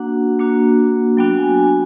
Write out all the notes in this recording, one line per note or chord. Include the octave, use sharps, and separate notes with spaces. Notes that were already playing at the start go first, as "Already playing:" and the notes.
Already playing: A#3 D4 F#4 F#5
A#3 D4 F#4
F#3 B3 D4 F#4 G5
G#5
G#5